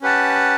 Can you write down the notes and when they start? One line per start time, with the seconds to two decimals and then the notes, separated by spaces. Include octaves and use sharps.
0.01 C#4 G4 B4 F#5 A5